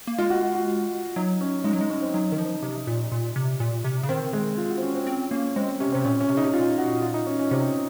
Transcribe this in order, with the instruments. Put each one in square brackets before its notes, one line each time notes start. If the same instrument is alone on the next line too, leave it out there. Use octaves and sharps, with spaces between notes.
[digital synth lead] A#3
[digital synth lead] G#3 [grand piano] F4
[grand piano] F#4
F#4
F#4
[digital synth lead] F#3 [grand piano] D#4
[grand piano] C#4
[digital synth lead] G#3 [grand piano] D#4
[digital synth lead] F#3
[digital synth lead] G#3 [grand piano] D#4
[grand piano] C#4
C4
[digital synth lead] F#3 [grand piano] D#4
[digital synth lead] D#3
F3
C3
A#2
A#2
C3
A#2
C3
C#3
[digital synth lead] D#3 [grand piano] C4
[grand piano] G#3
F4
F#4
C4
C#4
C4
[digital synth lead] C4 [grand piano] C#4
[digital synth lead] A#3 [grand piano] C#4
[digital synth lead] G#3 [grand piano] C4
[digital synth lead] C3 [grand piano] C#4
[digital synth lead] C3 [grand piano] C4
[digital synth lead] A#2 [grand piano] C#4
[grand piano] C#4
[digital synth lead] C3
[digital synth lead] C#3 [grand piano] D#4
[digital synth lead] C3
[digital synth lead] A#2 [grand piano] F4
[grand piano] F#4
F4
D#4
C#4
C#4
[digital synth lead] C3 [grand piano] C4